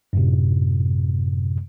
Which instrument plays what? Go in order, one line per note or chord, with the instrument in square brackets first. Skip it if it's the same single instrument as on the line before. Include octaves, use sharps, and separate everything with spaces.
[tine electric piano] F#2 A2 C3